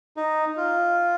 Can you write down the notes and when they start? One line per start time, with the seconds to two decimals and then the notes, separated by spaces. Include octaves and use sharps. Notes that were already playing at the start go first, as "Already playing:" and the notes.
0.17 D#4
0.57 F4